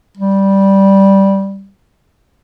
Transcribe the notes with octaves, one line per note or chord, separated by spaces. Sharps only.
G3